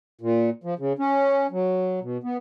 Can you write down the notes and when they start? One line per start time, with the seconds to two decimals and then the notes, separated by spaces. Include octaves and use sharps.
0.21 A#2
0.64 F3
0.79 C#3
0.99 C#4
1.51 F#3
2.02 B2
2.24 B3